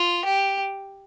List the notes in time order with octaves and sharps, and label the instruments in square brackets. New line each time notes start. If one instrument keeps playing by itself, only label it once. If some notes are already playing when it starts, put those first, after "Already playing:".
Already playing: [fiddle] F4
G4